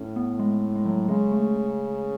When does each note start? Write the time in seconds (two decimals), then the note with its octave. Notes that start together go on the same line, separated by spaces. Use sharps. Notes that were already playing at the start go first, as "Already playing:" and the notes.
Already playing: A2 C#4
0.16 B3
0.39 G#3
0.75 G#3
0.86 F#3
1.08 C#3 G#3
1.32 A3